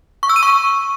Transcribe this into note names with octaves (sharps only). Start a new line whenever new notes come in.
C#6
E6
D#7
C#6